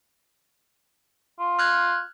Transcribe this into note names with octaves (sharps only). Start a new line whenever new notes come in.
F4
F6 F#6 G#6